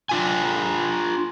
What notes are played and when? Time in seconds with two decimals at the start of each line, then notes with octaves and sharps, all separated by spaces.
0.09 D4 F4 G#5